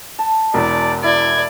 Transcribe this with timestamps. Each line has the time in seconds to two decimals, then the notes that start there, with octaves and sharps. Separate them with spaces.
0.19 A5
0.54 E1 E2 D5
1.04 E4 D5 G#6